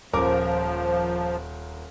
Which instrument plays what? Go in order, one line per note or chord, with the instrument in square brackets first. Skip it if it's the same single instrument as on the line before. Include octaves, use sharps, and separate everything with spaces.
[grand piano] D#1 A#4 D6 [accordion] F3